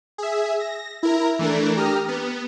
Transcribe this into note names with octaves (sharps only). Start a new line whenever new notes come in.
G#4 E5
A#6
E4 A#4 A#5
E3 A3 D4 A#4
G4 A#5 D#6 F6
B3